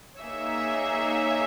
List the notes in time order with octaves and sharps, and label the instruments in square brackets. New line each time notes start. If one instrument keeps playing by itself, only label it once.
[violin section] A#3 D#4 G#4 C#5 E5